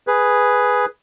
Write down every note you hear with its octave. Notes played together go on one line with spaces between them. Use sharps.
G#4 B4